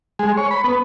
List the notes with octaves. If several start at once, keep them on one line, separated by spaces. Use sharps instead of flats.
G#3
C#5
B5
B3